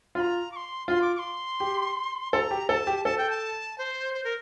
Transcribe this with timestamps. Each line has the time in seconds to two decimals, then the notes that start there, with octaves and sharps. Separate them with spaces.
0.15 F4 C6
0.20 A#5
0.52 D6
0.56 C6
0.88 F4 C6
1.02 D6
1.15 D6
1.19 C6
1.60 G4
2.32 A4 C6
2.36 A#5
2.51 G4
2.69 A4 A#5
2.73 A5
2.87 G4
3.05 A4 A5
3.18 G5
3.30 A5
3.78 C5
4.14 C5
4.24 A#4